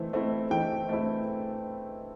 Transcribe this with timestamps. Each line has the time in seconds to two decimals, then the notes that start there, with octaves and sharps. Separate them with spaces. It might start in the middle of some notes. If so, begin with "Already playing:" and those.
Already playing: E3 A3 C4
0.13 A3 C4 E4
0.51 E3 G5
0.89 A3 C4 E4